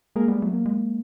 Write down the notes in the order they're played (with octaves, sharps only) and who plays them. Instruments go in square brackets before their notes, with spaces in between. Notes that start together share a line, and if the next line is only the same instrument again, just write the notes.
[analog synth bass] G#3 [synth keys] A#3 G#4 A#4
[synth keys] G3 B3 [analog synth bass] G#3
[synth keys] F#3 [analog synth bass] A3
[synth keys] A#3
[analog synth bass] G#3